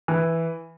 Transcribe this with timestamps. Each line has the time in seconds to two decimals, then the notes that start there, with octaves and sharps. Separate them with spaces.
0.08 E3